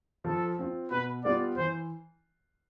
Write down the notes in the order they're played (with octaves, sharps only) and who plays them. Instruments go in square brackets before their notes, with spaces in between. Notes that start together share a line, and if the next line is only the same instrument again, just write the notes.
[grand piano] F3 [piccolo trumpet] A4
[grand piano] C4 F4
[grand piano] B2 [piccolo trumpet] B4
[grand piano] G3 B3 F4 [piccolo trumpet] D5
[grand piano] E3 [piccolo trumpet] C5